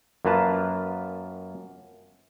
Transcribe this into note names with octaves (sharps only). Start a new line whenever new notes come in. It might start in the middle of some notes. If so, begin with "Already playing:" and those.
F#2 A#3 F4 B4 A5